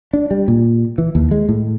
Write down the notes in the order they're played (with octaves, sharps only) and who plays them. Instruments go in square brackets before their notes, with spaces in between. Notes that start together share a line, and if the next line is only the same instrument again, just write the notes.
[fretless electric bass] D4
G3
A#2
E3
D#2
G#3
A2